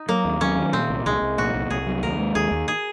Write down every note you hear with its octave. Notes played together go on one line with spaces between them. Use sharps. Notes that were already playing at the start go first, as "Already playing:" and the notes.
Already playing: D#4
F#3 A#3
D#2
F#3 C#4
D#3
A#2 C4
C2
C2 G#3
C2
A#2 F#4
C2
C2 G#4
F#3
D#2 A#4
G#3
D#2 G#4
D#2
G#4